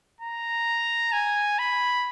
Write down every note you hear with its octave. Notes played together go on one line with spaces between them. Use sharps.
A#5
G#5
B5